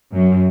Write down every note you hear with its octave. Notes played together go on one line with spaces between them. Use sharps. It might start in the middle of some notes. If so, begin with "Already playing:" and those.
F#2